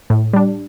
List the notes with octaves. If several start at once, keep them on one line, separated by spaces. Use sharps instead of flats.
A2
G3 D4